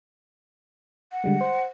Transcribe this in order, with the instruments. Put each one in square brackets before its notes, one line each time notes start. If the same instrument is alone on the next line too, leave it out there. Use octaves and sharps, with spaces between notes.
[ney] F#5
[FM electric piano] D3 G3 G#3
C5